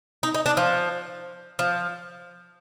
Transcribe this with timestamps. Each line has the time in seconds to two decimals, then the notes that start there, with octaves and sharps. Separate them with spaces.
0.23 D#4
0.34 D#4
0.46 D4
0.57 F3
1.59 F3